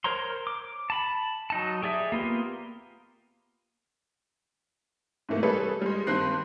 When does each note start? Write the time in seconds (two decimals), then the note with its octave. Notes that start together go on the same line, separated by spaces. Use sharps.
0.04 A#4 C5 C#5 A#5 C6
0.47 D6
0.90 A5 B5
1.50 F#3 D#4 A5
1.82 G4 G#4 D5 E5
2.12 A#3 B3 F4 G4
5.29 G#2 C3 E3 A3 A#3
5.43 G3 G#4 A4 B4 C#5
5.82 G3 G#3
6.07 G2 D#3 C4 F#6 C7